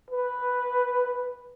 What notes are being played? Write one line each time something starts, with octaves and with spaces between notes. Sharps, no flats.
B4